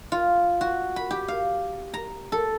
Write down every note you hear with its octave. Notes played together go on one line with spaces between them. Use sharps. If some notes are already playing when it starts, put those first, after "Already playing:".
F4
F#4
B5
G4
F5
A#5
A4